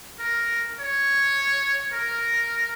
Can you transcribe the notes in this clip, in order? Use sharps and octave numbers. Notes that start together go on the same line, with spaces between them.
A#4
C#5
A#4